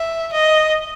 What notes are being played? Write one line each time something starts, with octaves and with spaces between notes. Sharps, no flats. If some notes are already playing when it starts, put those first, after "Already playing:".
Already playing: E5
D#5